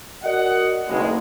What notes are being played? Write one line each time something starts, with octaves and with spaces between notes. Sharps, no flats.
F#4 A#4 D5 D#5 F#5
F#1 B1 G#3